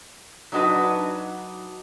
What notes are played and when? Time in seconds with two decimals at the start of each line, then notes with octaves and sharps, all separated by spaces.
0.52 F#3 D4 D#4 F#4 B4